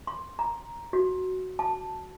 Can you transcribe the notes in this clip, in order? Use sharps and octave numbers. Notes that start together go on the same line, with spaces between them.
C6
A#5
F#4
A5